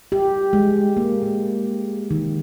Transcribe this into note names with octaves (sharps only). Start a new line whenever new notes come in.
G4
G#3
A#3
A#3
D#3